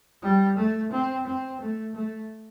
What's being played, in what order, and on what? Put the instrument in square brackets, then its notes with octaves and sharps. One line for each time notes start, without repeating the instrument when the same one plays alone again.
[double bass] G3
A3
C4
C4
A3
A3